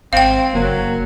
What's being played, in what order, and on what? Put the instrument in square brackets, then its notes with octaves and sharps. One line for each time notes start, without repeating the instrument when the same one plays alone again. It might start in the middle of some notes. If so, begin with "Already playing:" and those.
[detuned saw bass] G#1 [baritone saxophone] C4 [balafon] F5 G5
[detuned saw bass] F#1 [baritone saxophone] F#3 [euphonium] A#3